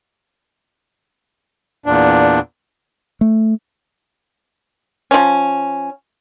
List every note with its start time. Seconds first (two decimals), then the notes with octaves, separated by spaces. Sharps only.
1.86 E2 A#2 D4
3.21 A3
5.11 F3 C#4